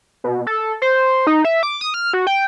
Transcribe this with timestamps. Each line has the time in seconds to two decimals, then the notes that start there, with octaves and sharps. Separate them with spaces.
0.24 B2
0.47 A4
0.82 C5
1.27 D#4
1.45 E5
1.63 D6
1.81 D#6
1.94 F6
2.13 F#4
2.27 G5